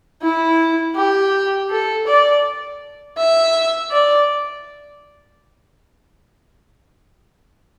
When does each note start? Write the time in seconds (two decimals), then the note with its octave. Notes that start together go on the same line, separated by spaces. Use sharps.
0.22 E4
0.96 G4
1.70 A4
2.07 D5
3.18 E5
3.91 D5